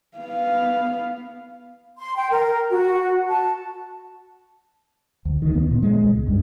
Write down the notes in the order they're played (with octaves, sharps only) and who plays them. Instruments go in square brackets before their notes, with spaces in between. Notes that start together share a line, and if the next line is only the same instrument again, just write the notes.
[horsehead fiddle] B3 F5
[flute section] C6
G5
A#4
F#4
A5
[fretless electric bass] D2
D#3
B3
A#2
G#3
C#2
G2